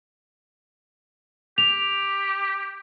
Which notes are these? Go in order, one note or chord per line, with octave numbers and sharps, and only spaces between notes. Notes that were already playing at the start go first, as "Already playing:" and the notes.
G4 F7